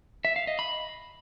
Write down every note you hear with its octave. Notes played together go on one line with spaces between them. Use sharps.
E5
F5
D#5
B5